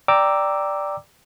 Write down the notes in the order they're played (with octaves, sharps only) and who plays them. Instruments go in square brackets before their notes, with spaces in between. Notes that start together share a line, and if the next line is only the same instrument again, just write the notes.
[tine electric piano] D5 G5 A#5 D6 E6